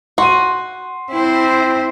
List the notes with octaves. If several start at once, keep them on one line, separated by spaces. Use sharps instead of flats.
F#4 C6 D#7
C4 E4 C5